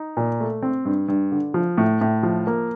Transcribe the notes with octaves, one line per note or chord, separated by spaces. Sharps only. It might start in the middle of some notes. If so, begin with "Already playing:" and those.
Already playing: D#4
A#2
A3
C4
G2
G2
D3
F3
A2
A2
F3
A#3